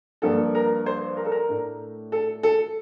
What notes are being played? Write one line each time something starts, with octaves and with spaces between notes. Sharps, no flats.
G2 F3 A#3 A4
A#4
C5
A#4
A4
A#4
A2 A3 D4
A4
A4